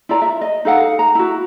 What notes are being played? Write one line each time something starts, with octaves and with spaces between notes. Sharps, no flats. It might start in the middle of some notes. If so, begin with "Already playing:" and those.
E4 F4 D5 A#5
E5
D#5
D#4 A4 F5 F#5
A#5
E4 F#4